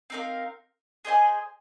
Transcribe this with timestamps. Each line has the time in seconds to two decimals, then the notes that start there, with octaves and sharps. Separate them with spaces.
0.10 C4 D#4 A#4 F5
1.05 G#4 C5 D#5 G#5